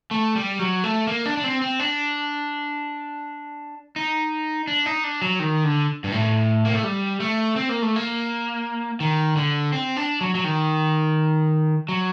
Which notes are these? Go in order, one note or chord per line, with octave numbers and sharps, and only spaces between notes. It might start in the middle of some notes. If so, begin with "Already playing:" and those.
A3
G3
F#3
A3
A#3
D4
D4
C4
C4
D4
D#4
D4
D#4
D4
F#3
D#3
D3
G2
A2
A#3
A3
G3
A3
C4
A#3
A3
A#3
D#3
D3
C4
D4
F#3
F#3
D#3
F#3